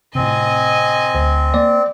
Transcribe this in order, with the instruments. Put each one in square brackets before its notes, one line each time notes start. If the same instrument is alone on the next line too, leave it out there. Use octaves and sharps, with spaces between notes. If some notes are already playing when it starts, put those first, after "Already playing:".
[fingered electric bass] A2 C3 [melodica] C4 [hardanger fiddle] D#5 G#5
[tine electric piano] D2
[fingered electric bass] A#3 [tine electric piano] D5